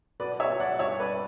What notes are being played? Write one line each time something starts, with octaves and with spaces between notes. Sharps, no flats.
B2 B4 D5
C#5 E5
B2
D5 F#5
G2 C#5 E5
B4 D5